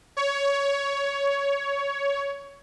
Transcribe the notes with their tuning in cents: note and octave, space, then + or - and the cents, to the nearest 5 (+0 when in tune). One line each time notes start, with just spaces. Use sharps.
C#5 +15